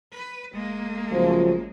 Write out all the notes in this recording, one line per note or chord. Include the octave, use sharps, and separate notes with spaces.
B4
F1 G#3 A#3
G#1 F#2 C#3 F3